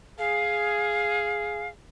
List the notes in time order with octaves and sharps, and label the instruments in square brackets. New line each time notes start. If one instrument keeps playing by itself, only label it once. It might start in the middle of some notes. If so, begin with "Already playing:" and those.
[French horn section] G#4 [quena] F5